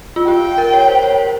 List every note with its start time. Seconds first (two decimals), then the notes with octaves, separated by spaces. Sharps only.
0.16 F4
0.28 G4 G5
0.58 A#4
0.73 C#5
0.88 C5
1.03 C#5
1.18 C5